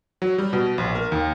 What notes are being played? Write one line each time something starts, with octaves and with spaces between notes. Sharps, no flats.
F#3
G3
B2
A#1
A#4
D#2